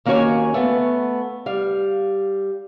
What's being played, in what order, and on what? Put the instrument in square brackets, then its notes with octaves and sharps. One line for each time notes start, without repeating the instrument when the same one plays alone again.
[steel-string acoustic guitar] D#2 A#3 C#4 F#4 C#5 G#5
A3 B3
G3 F5